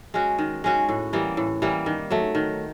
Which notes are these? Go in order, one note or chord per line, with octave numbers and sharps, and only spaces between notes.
G#3 C#4 F#4
D#3
G#3 C#4 F#4
A2
E3 G3 A#3
A2
E3 G3 A#3
D#3
F#3 A3
D#3